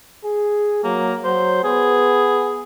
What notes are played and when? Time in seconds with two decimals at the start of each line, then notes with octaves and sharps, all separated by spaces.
0.25 G#4
0.84 F#3 A#3
1.24 F#3 C5
1.64 B3 G#4